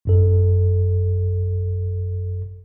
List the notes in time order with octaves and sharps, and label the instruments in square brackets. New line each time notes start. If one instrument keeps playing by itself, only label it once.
[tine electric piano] G#1 F#2 A4